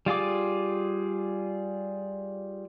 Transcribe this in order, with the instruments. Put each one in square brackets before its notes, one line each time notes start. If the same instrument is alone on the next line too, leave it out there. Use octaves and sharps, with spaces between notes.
[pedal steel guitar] G3 F4 G#4 D6